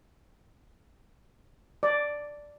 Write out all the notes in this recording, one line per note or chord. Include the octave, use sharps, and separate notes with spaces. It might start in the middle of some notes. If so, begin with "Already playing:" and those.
D5